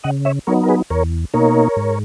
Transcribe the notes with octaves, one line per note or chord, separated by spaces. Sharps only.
C#3 D#5 F#5
C#5 E5
F#3 B3 D#4 A#4 C#5
A#4
G#4 B4
E2 A#4 C#5
B2 A#3 D#4 A#4 C#5
G#2